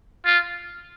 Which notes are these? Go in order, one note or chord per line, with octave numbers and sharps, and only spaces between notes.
F4